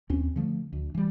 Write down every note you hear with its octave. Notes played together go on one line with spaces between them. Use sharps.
D#2 C4 C#4
D3 F3 A3
D2
E3 G3